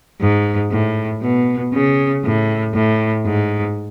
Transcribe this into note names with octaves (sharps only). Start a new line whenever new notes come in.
G#2
A2
B2
C#3
A2
A2
G#2